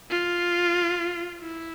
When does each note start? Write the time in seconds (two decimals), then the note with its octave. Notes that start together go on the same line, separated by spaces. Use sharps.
0.10 F4
1.41 E4